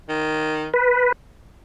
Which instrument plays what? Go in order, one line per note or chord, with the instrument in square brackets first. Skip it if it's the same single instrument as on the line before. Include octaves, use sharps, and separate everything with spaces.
[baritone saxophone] D#3
[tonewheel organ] B4